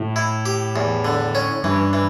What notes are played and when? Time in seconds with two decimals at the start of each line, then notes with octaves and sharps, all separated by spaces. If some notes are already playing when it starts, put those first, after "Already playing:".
Already playing: A2
0.16 E4
0.46 G4
0.76 E2
1.05 D3
1.35 C#4
1.64 G2 E3
1.93 E3